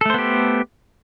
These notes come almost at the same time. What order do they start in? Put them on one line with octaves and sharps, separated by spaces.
A4 A3 C5 B3 G4